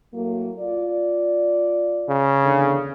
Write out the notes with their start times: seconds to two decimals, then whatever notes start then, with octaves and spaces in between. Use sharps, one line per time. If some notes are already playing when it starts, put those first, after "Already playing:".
0.14 A2 F#3 A#3
0.60 F4 D5
2.09 C#3
2.44 E2 D3